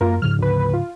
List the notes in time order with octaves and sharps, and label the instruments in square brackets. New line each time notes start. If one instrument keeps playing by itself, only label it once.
[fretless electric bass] F#2 [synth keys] A#3 F4 A#4
[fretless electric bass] G#2 C#3 F3 [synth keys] F6
[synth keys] D2 B4
F4